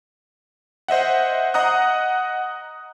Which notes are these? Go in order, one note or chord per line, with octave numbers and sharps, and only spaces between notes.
C5 D#5 E5 F#5
D#5 F#5 A#5 D#6 F#6